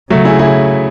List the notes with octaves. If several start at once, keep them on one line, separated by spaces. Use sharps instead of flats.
C#3 F#3 A3
E4 G#4
E4 G#4